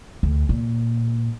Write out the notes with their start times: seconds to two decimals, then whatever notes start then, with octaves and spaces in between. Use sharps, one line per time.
0.23 D2
0.49 A#2